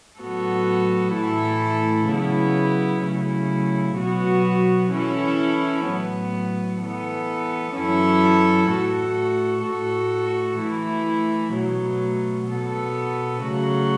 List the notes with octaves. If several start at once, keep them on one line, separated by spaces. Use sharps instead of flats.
A2 F#3 B3 F#4 A4
A2 E3 A3 E4 A4
C#3 F#3 B3 E4
C#3 F#3 A3 E4
B2 F#3 B3 F#4
E3 C#4 E4 A4
A2 F#3 B3
E3 B3 A4
F#2 E3 C#4 E4 A4
A2 A3 F#4 A4
A2 A3 F#4 A4
E3 A3 E4
B2 F#3 A3
B2 B3 A4
C#3 F#3 A3 F#4